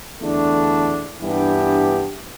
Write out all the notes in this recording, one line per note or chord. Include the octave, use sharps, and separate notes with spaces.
E2 D3 A3 D4
G2 E3 B3 D4 G4